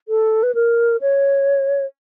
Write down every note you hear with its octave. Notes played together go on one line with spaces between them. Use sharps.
A4
B4
A#4
C#5